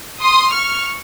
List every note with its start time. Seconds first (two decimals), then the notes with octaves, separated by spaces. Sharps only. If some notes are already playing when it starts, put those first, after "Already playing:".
0.22 C6 D#6
0.54 C#6 F6